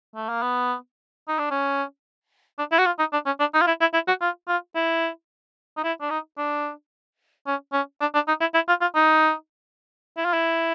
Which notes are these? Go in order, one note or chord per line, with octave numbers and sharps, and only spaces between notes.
A3
A#3
B3
D#4
D4
C#4
D4
E4
F#4
F4
D#4
D4
C#4
D4
D#4
F4
E4
E4
E4
F#4
F4
F4
E4
D#4
E4
D4
D#4
D4
C#4
C#4
D4
D4
D#4
E4
E4
F4
F4
D#4
E4
F4
E4